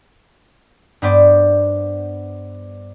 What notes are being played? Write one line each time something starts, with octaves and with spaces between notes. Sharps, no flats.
G2 B3 C5 D5